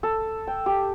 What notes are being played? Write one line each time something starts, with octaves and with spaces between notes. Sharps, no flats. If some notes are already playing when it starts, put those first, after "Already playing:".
A4
G5
G4